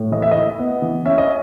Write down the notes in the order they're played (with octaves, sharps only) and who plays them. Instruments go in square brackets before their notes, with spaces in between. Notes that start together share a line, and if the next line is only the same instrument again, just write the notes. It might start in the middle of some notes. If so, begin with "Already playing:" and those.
Already playing: [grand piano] A2
E3 D#5
E5
E4 D#5
B3
E3
C#4 E5
D#5